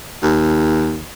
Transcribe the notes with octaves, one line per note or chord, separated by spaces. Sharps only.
D#2